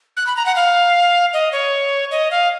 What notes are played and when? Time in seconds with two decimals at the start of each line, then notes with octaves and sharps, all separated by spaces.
0.17 F#6
0.27 B5
0.36 A#5
0.46 F#5
0.56 F5
1.33 D#5
1.52 C#5
2.11 D#5
2.31 F5